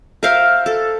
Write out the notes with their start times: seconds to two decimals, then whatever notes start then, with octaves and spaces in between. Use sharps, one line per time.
0.23 A#4 C5 E5 F5
0.66 A4